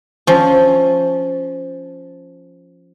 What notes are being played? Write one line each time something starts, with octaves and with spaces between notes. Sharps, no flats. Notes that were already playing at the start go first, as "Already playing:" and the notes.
F3 C#4